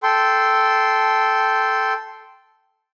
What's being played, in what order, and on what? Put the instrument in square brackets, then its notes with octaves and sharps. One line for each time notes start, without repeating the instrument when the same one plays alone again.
[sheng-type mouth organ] A4 G5 C6